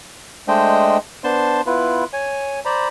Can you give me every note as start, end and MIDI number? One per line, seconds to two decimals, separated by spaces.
0.48 0.98 56
0.48 0.98 57
0.48 0.98 62
0.48 0.98 72
0.48 0.98 75
0.48 0.98 79
1.24 1.61 59
1.24 1.61 62
1.24 1.61 72
1.24 1.61 81
1.24 1.61 84
1.66 2.04 59
1.66 2.04 64
1.66 2.04 65
1.66 2.04 71
2.13 2.60 73
2.13 2.60 80
2.65 2.88 72
2.65 2.88 74
2.65 2.88 82
2.65 2.88 83